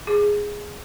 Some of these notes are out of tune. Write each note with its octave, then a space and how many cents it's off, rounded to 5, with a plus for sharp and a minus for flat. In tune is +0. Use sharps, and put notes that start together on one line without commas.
G#4 -5